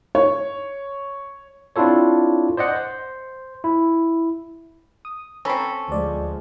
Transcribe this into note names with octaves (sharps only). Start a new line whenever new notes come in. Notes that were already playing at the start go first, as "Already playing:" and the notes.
C#5
C4 D4 E4 F4 A4 C#5
C5 D5 D#5 F#5
C5
E4
D#6
C4 C#4 A4 A#5 B5
D2 F3 G#3 D5